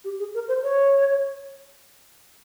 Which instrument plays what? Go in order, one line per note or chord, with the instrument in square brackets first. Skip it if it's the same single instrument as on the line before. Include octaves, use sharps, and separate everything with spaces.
[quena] G4
G#4
A#4
C5
C#5